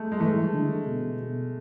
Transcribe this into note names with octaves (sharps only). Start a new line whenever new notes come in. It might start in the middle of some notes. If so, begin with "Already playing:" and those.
Already playing: G#3 A3
G#3
E3 A3
D3
B2